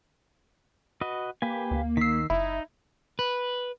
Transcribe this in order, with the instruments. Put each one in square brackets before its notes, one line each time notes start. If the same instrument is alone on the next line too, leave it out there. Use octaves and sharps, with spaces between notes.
[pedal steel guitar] F#4 B4 D#5
[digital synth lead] A#3 [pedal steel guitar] G4 B4 G#5
[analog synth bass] D2
[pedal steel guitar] D#3 E6 [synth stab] B6 C7
[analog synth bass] F#1 [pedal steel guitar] D#4 [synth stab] E4
[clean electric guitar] B4